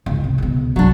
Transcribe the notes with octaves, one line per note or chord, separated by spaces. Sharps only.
F#1 C#2
C3
C#2 B2
C2 F#3 D4